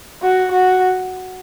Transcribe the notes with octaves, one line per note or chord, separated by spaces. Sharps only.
F#4
F#4